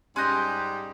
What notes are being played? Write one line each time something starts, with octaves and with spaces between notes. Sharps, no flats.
G#2 G3 C#4 D#5 C6 F#6 G6